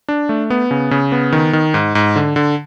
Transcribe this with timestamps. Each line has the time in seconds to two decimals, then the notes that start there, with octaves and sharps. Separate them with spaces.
0.08 D4
0.29 A3
0.50 B3
0.71 C#3
0.91 C#3
1.12 B3
1.32 D#3
1.53 D#3
1.74 G#2
1.95 G#2
2.16 D3
2.36 D3